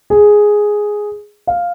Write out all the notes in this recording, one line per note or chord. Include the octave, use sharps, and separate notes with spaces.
G#4
F5